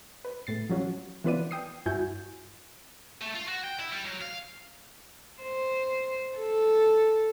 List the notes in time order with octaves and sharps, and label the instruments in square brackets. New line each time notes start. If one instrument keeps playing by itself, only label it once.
[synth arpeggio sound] B4
A2 A6 C7
F3 F#3 C#4 F#4
E3 B3 F4 B4 D5 D#7
G5 D#6 C7
G2 E4 F#4 G#5 G6
[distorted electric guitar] A3
F4
F#4
G5
E4
G3
F#3
F5
[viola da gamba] C5
A4